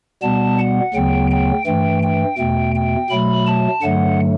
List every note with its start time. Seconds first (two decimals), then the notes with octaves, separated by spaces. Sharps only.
0.22 B2 G3 B3 A5
0.59 F#5
0.94 D2 C#3 F#3 B3 G5
1.31 G5
1.66 G2 E3 A3 G5
2.03 G5
2.38 E2 B2 A3 G5
2.75 G5
3.10 B2 F#3 A3 B5
3.46 A5
3.82 G2 D3 F#3 A3 F#5